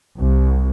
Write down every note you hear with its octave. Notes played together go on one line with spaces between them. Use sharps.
C2